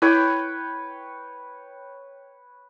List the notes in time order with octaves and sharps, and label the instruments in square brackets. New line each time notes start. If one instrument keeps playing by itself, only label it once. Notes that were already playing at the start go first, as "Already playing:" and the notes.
[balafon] E4 [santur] B4 C#5 G5